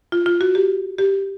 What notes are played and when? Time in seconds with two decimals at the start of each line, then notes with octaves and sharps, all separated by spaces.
0.12 F4
0.26 F4
0.41 F#4
0.55 G4
0.98 G4